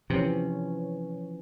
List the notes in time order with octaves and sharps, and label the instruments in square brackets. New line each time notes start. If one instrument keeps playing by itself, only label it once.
[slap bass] C3 [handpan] E3 F3 C#4